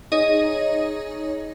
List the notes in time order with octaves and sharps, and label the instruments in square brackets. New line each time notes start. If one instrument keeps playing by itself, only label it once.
[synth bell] D#4 G#4 C#5 D#5